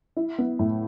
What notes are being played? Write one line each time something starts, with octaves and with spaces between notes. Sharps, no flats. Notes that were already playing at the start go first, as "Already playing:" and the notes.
E4
B3
A2